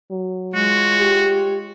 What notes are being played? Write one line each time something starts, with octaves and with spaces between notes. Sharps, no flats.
F#3
G#3 F4 F#4 C#5
G4